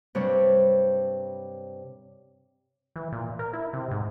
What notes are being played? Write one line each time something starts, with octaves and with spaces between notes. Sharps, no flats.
G2 C3 G3 D4 C#5
E3
A#2
A#4
E4
C3
G#2